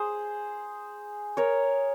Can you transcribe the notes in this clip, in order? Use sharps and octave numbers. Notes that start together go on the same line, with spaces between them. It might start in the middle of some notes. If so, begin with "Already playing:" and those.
Already playing: G#4 C5
A#4 C#5